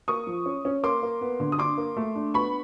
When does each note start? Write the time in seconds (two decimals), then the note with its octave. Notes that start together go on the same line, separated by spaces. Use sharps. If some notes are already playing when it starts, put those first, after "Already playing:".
0.08 A#3 C#6 D#6
0.27 F3
0.46 C#4
0.65 C#4
0.83 A#3 C6 D6
1.03 A#3
1.21 B3
1.40 D3
1.52 D#6
1.58 D4 C6 D6
1.78 A#3
1.97 A3
2.15 D4
2.34 B3 B5 C#6